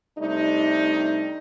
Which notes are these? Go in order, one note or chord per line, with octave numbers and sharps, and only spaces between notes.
C3 G3 A3 D4 D#4